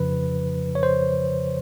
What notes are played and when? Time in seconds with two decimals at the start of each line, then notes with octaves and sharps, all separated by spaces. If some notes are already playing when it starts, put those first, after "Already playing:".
Already playing: F2 C#3 F3 B4
0.75 C#5
0.83 C5